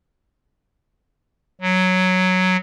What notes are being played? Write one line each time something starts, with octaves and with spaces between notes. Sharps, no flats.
F#3